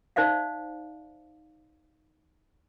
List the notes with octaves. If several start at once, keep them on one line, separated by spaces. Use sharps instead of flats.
D#4 C5 D5 E5 F5